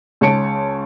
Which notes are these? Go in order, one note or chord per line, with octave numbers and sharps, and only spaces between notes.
C#2 C#5 A5 C#7 D7